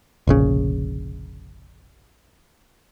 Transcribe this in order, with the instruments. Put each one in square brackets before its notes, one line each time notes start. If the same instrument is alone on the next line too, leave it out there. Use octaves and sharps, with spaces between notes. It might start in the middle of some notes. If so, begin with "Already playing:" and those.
[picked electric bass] F1 A#1 C#3